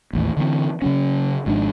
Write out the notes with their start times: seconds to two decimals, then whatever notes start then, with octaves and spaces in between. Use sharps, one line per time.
0.13 A1 D#2 A2
0.37 D3 E3 G#3 C4
0.82 C#3 F#3 C#4
1.46 G#1 G#2 F3 D4